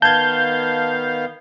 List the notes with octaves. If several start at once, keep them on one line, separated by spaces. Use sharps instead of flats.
D#3 B3 F5 A5 G6 G#6